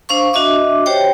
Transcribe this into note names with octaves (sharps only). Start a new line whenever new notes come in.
D4 C5 F5 C#6
D4 F#4 D#5 E5 D6
G4 C5 C#5 G5